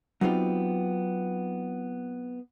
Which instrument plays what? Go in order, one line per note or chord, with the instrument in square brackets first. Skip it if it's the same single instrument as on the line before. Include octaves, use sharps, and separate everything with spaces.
[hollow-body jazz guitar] F#3 B3 C4 D#4 F4 G4